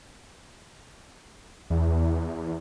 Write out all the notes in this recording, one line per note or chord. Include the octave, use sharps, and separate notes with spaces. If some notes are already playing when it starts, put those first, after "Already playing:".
E2